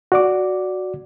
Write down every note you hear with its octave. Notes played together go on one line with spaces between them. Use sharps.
F#4 D5 D6